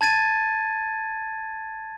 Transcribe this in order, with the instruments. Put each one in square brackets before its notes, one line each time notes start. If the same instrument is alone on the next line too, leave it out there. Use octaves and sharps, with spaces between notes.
[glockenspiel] A5 G#6 A6 D#7